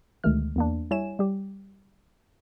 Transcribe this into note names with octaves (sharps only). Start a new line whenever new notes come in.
D2 B2 D#3 G#3 A3 F6
E2 A#3 D4
G3 E4 C#5 E5 G#5 E7
G3 G4